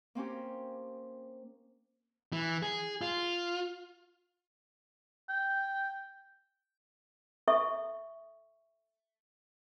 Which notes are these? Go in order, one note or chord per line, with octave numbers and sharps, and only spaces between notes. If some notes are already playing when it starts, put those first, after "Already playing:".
A#3 C4 C#4 G4
E3
G#4
F4
G5
A4 E5 C#6